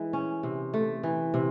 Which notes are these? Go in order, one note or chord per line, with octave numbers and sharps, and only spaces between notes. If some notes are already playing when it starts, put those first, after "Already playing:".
Already playing: E3 G#3
C#4
C3
A3
E3
C3